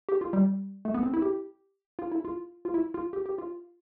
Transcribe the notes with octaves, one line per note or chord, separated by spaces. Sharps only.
G4
F4
G3
A3
B3
C4
E4
G4
F4
E4
F4
F4
E4
F4
G4
G4
F4